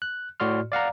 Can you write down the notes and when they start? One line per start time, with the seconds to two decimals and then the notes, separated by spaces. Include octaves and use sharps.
0.02 F#6
0.40 A2 F#4 D5 C6 F6
0.72 D5 F5 F#5 A#5